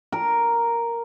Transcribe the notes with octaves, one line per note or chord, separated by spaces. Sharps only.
A#4